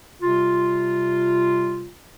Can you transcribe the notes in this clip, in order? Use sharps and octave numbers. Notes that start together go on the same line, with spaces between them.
C3 G3 F4